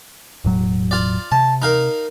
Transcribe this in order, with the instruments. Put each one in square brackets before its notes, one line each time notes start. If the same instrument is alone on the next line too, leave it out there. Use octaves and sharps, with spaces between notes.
[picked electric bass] E1 A2 F#3
[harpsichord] F4 D5
[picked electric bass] C3 [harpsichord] A5
[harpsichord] D#4 A#4 F5